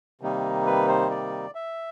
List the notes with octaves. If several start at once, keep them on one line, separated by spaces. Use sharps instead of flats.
C3 D#3 G3 A#3 D#4
B4
C5
D5
E5